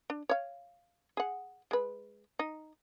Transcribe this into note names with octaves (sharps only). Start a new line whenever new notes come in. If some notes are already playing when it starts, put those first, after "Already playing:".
D4
C#5 F5
G#4 F#5
G#3 B4
D#4